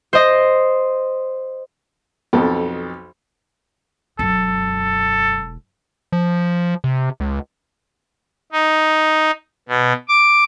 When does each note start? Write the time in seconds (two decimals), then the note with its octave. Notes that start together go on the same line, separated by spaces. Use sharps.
0.13 C5 D#5
2.33 B1 F2 A4
4.19 E1 F#2 A4
6.12 F3
6.84 C3
7.20 C#2
8.52 D#4
9.69 B2
10.08 D6